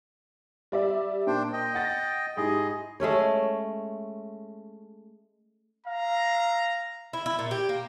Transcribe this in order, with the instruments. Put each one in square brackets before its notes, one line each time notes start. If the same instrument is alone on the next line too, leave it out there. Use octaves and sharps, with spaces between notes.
[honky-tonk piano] G3 D5 E5
[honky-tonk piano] A#2 [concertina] D4 C5 G5
[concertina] D#5 G5
[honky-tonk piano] F#5 A6 A#6
[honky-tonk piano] G#2 E4 G4 [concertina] G#4 D#5
[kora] G#3 A3 C#4 C#5
[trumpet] F5 [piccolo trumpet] A#5
[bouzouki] E4
E4
A#2
G4
A#3